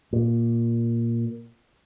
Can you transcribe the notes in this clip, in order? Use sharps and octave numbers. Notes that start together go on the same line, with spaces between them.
A#2